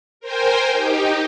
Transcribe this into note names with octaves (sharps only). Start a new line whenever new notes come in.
A#4 C5 G5 G#5
D#4 G4